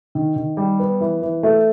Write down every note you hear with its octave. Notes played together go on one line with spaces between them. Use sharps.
D#3
D#3
G3
B3
E3
E3
A3